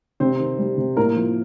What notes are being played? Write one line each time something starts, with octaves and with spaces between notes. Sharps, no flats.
C3 C4 C5
D#3
G3
C3
A2 A#3 A#4
F3